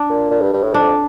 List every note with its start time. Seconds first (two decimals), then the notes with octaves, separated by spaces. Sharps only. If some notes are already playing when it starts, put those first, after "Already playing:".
Already playing: D4
0.10 A#2
0.31 A#2
0.42 G2
0.53 G2
0.63 A2
0.74 F2 D4